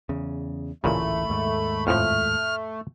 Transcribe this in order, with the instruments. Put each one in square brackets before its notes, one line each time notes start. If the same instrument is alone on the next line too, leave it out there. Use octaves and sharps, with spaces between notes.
[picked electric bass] E2 C#3
[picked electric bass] D1 A1 E3 [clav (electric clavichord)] A#2 C#3 [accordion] A3 [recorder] B5
[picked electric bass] D#2 G#2
[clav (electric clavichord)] F2 A2 F3 [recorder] F6